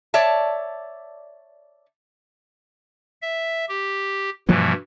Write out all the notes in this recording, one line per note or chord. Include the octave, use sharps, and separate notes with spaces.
C#5 D5 E5 A5
E5
G4
G2 B2 E3 F3 G3 A#3